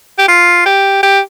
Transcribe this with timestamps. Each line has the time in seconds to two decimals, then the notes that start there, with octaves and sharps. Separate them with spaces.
0.19 G4
0.29 F4
0.66 G4
1.03 G4